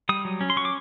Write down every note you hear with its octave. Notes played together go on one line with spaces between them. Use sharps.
G3 D#6
F#3
C#4
C6
F#3 C#6
D6